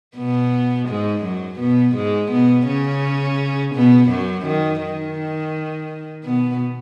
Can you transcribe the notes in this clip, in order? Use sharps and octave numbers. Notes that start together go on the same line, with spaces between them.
B2 B3
G#2 G#3
F#2 F#3
B2 B3
G#2 G#3
B2 B3
C#3 C#4
B2 B3
F#2 F#3
D#3
D#3
B2 B3